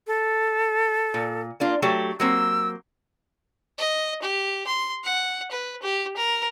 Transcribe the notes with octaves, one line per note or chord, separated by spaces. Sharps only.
A4
A#2
A#3 D4 F4
F#3 A3 G4
F#3 A#3 C4 E6
D#5
G4
C6
F#5
B4
G4
A#4